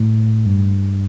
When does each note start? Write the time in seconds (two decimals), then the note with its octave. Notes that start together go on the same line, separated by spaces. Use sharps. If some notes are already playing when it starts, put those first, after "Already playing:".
Already playing: A2
0.46 G2